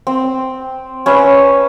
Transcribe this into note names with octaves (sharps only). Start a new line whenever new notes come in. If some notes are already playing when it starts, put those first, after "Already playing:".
C4
C#4 B4 E5